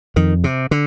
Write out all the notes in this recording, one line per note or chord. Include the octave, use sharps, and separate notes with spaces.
F2 D#3
C3
D3